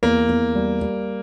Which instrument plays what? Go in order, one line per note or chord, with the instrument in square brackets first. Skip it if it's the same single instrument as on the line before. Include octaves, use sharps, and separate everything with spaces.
[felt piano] E2 [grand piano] A#3
[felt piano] E2
G3
G3